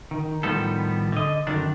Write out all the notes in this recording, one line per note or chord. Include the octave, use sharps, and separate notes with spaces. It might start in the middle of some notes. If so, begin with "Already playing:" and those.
D#3
A2 D#3 F3 G3 B3 A4
D3 D#5
F#2 D3 D#3 D4